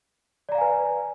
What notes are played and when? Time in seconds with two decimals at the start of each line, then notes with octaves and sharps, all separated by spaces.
0.49 D5
0.52 A#5
0.55 F5
0.58 G#5
0.61 B4